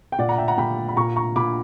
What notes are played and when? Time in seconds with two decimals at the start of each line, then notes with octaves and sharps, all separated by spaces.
0.12 G5
0.19 A#2 D5 F#5
0.29 F#5 A#5
0.38 E5 G5
0.48 F#5 A#5
0.58 A#2 G5 B5
0.88 B5
0.96 A#2 A#5 C#6
1.16 A#5 C#6
1.36 A#2 B5 D6